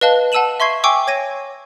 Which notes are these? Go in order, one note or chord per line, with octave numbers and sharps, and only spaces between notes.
B4 D#5 F5 A5 F#6 G7
F#5 A5 E6 D#7 E7 F#7
E5 C6 C#6 G#6 C7
G5 G#5 C#6 D6 E6
C#5 G#6 A#6 D#7